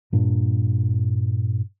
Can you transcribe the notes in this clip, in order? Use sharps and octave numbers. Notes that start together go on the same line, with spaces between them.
G2 A#2 D4